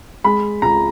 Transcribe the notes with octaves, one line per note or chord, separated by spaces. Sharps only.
G#3 B5
C#2 A#5